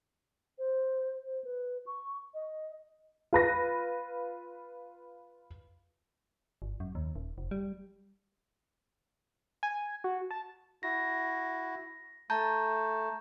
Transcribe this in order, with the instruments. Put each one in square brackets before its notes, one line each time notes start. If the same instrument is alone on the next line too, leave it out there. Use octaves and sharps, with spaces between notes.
[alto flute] C5
C5
B4
C#6
D#5
[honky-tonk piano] F4 B4 A#6
[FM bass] G1
F#2
D#2
D#1
F1
G3
[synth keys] G#5
F#4
A5
[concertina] E4 F#4 [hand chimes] A#6
[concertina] A3 [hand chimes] A5 A#5 G6